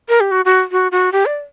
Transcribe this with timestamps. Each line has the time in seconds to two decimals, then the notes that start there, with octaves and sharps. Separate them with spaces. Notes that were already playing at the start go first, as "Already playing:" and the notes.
0.09 A#4
0.20 G4
0.31 F#4
0.45 F#4
0.72 F#4
0.92 F#4
1.12 G4
1.26 D5